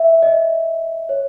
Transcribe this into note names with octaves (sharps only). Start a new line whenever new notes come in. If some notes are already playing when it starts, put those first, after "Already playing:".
Already playing: E5
D#5
C#5